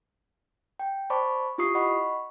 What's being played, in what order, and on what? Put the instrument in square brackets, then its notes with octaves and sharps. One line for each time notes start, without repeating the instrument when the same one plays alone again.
[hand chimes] G5
C5 D5 A5 B5 C#6 D6
E4 F4 G4 C#6 D#6 C7
D#5 F#5 B5 C#6